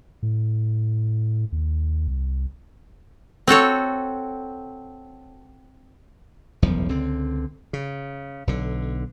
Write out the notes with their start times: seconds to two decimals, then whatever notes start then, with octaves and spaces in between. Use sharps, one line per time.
0.23 A2
1.52 D#2
2.08 C2
3.47 C4 F#4 A4 C#5
6.62 F#1 B1 E2 F3
6.89 C#2 D3 C4
7.73 C#3
8.47 B1 D3